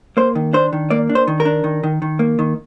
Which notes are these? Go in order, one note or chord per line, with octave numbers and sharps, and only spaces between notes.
A#3 C5
D#3
D4 C5
D#3
A#3 D5
D4
C5
D#3
A#4
D4
D#3
D#3
D#3
A#3
D#3